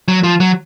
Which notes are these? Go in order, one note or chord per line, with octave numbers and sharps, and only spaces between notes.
F#3
F3
F#3